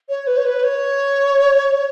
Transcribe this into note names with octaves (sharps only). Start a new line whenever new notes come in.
C#5
B4
C#5
B4
C#5